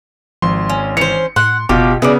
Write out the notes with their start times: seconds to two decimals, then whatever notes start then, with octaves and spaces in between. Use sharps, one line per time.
0.42 G#1 F3 C6
0.69 C#4
0.97 E3 C#4 C5 C#7
1.36 A2 F#5 C6
1.69 F#1 B2 F4 G4 D6
2.02 C#3 G#3 B3 E4 F#4 D5